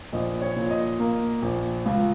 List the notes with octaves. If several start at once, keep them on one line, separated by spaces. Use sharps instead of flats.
A#1 D#5
C#5
A#2
D#5
A#3
A#1
C#2